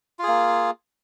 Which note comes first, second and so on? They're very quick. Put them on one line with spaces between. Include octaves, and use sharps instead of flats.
F4 G#4 A#3